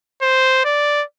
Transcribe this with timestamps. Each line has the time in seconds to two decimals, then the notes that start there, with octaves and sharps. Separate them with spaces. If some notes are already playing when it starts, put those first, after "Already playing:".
0.22 C5
0.65 D5